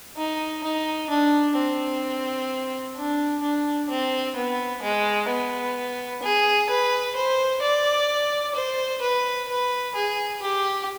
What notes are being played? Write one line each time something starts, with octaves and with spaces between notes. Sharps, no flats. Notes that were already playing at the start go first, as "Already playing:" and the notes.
D#4
D#4
D4
C4
D4
D4
C4
B3
G#3
B3
G#4
B4
C5
D5
C5
B4
B4
G#4
G4